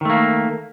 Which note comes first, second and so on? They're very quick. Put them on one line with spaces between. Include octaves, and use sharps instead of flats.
D#3 A3 A#3